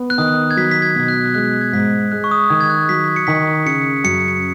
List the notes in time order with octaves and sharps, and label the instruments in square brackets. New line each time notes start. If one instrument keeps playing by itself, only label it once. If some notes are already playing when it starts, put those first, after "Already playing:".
Already playing: [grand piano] B3
[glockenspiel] F#6
[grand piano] D#3 [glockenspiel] D#6
[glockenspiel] G#6
[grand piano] F#3 [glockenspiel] B6
[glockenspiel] B6
G#6
[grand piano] B2
[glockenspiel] F#6
[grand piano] G#3 [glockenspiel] F#6
[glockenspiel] G#6
[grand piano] G#2 [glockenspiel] B6
[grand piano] G#3 [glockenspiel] F#6
[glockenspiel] C#6
D#6
[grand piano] D#3 [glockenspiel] G#6
[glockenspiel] G#6
F#6
[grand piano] F#3 [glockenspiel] B6
[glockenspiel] C#7
[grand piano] D#3 [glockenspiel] B6
[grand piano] C#3 [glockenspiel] C#7
[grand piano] F#2 [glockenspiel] C#7
[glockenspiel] C#7